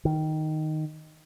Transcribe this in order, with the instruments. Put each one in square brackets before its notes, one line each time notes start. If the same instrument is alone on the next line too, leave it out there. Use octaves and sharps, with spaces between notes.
[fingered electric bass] D#3